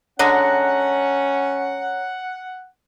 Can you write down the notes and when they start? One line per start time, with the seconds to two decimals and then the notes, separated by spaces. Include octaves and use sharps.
0.19 D3 G#3 C#4 F#4 C#5 F#5 A#5 A#6